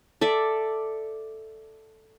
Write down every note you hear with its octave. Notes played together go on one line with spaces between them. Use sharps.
A4 D5 E5